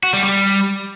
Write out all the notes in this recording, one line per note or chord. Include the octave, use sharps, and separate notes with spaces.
F#4
G3
G3